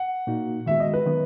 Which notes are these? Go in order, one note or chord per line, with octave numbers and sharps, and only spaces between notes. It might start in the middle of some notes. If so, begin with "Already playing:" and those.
Already playing: F#5
A#2 A#3 D#4 F#4
D#3 G#3 B3 F#4 E5
D#5
B4
D#3 F#3 B3